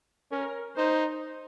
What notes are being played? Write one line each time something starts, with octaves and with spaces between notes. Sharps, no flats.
C#4 A#4
D#4 C5